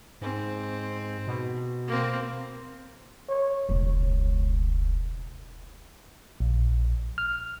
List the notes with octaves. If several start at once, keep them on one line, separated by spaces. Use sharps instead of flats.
G#2 C4
B2
A#3 C4
C#5
E1 C#2
A#1
F6